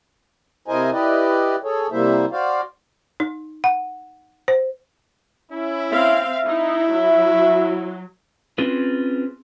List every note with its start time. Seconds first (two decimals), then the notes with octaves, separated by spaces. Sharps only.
0.68 C3 E4 A#4 C5 D#5 G#5
0.92 E4 G4 B4 D5 D#5
1.64 G#4 A4 C#5
1.92 C3 G3 A#3 E4 C5 E5
2.32 F#4 C5 D5 F5
3.20 D#4
3.64 F#5
4.48 C5
5.52 C#4 E4
5.91 C4 E5 F5
6.45 D#4 E4
6.92 F#3
8.58 C4 C#4 F4 G#4 B4